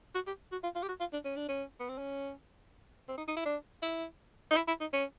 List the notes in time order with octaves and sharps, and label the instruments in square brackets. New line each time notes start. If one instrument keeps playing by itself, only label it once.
[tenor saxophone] F#4
G4
F#4
F4
F4
G4
F#4
F4
D4
C#4
D4
C#4
B3
C4
C#4
C4
D#4
D#4
E4
D4
E4
D#4
E4
E4
D#4
C#4